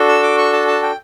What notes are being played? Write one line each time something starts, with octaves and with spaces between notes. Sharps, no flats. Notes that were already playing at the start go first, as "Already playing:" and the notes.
Already playing: D4 F#4 A4
E6
D6
C#6
A5
A5
G5